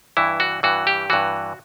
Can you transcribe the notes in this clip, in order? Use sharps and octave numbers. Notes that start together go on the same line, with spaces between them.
G2 E3 E4
F#4
G2 E3 F#4
G4
G2 E3 F#4